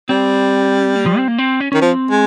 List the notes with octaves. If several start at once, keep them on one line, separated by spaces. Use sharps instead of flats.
G3 C4
A#3
F3
C4
A#3
C4
C#4
D#3 C#4
F3 C4
G#3